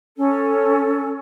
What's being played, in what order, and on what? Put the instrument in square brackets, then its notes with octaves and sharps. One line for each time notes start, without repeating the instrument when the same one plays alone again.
[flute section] C#4 A4